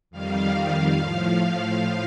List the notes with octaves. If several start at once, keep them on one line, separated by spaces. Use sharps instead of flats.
F2 D#3 G3 F5
A2 F3